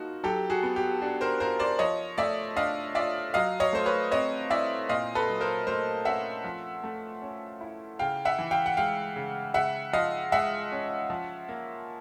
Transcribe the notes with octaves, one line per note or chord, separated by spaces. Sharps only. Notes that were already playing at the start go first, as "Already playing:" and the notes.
Already playing: F3 A#3 D#4 F#4
F#3 G4 A4
F#4 G#4
B3
G4
D4 F#4
A#4 C5
F4 A#4 C5
C5 D5
F3 C#5 D#5
A3 D5 E5
D4 D#5 F5
F4 D5 E5
F#3 D#5 F5
C#5 D#5
A3 C5
B4 C#5
C4 C#5 D#5
E4 D5 E5
A#2 D#5 F5
A4 B4
F#3
A#4 C5
A3 A#4 C5
C#4 E5 F#5
F3
A3
C#4
E4
C#3 F5 G5
E5 F#5
E3
F5 G5
F#5
G#3 F5 G5
C#3
C#3 E5 F#5
F3 D#5 F5
G#3 E5 F#5
C#4
F3
A#3